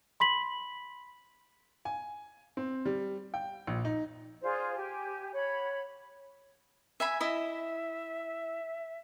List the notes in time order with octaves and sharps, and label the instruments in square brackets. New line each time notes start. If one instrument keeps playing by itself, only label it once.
[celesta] B5 C6 B6 F#7
[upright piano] G#5
C4
G3
G5
A#1
D#4
[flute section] F4 G#4 C5 D5
G4 G#5
C#5 F#5 B5
[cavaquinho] E5 G#5 B5
[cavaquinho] E4 D#5 [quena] E5